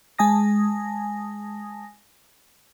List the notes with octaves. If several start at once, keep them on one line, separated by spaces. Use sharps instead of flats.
G#3 G#5 A5 D#6 A#6